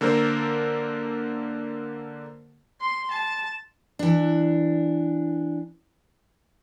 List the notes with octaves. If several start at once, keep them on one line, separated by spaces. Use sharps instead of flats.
D3 A#3 A4 A#4 C5
C6
A5
E3 D4